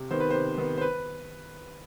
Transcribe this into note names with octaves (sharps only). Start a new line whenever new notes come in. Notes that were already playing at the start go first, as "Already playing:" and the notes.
Already playing: C3
D#3 B3 C5
B4
C3 C5
D#3 B3
C5
B4